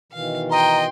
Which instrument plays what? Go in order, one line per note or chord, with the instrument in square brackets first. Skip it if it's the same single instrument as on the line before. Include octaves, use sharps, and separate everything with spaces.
[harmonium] B2 D#3 E3 [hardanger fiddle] F5
[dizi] D#5 [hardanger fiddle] G5 C6 [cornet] A#5